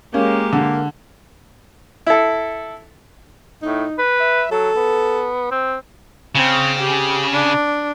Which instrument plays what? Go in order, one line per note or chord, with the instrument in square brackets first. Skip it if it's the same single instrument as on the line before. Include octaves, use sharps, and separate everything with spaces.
[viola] G#3 G4 [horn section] A#3 [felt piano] C#4
[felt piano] D3
[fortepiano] E4 A4
[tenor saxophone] A2 [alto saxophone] D#4
[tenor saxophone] B4
[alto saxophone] E5
[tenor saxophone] F#3 [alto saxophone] A4
[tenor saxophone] B3
C4
[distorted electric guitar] C#3 [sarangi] C4
[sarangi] G4
D4